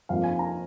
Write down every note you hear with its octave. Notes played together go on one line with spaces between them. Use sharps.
F2 F3 A#3 F5
G#5
A#5